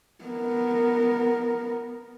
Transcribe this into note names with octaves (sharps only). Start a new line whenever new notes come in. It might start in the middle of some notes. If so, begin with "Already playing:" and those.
B3 A#4